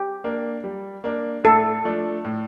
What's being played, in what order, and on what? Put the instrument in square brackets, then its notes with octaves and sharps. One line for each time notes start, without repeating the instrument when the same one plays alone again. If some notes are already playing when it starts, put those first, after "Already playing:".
Already playing: [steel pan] G4
[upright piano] A#3 D4
G3
A#3 D4
[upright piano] A2 [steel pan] A4
[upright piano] F3 A3 D4
A2